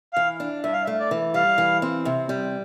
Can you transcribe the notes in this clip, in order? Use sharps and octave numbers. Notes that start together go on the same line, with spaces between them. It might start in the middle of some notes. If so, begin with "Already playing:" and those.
E3 F5
D4
G2 E5
F5
E5
A3
D5
E3
G3 F5
E3
C4
C3
G3